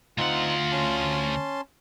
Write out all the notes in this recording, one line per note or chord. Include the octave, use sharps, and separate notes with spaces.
D2 C4 D#4 F4 F#5
C#4 A5 C6